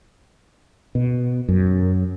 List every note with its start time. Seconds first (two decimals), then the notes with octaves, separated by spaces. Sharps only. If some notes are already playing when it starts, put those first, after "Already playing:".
0.95 B2
1.49 F#2